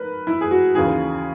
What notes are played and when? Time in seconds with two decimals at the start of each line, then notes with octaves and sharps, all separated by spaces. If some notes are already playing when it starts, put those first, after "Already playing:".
Already playing: G#2 A#4 B4
0.27 E4
0.41 G#4
0.51 F#4
0.75 D#2 C#3 E3 G#4